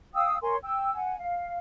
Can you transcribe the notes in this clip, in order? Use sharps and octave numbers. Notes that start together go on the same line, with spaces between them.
F5 G5 D#6 E6
A#4 C#5 G#5 C6
G5 E6
F#5 G#5
F5